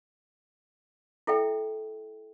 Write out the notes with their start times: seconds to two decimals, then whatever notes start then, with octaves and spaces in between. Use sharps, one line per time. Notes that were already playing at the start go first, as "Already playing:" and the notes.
1.27 E4 A4 E5 G5